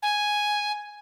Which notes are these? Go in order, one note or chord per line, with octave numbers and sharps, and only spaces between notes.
G#5